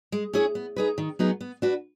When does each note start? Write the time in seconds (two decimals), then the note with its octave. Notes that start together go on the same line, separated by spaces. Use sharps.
0.12 G#3
0.33 C#4 E4 G#4 C#5
0.55 B3
0.76 D#4 G#4 B4
0.98 D#3
1.19 F#3 B3 D#4 G#4
1.41 B3
1.62 D4 F#4 B4